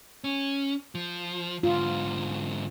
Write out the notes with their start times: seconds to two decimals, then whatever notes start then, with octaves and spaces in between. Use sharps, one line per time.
0.24 C#4
0.95 F3
1.63 G#2 D3 F4